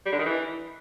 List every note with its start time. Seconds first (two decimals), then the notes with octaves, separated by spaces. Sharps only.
0.06 G3
0.12 D3
0.19 D#3
0.25 E3